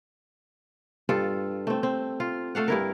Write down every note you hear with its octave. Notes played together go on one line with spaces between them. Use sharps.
G2 F4 A4
A3 C4
C4
F4
A3 A4 F5 F#5
G2 E4 A#4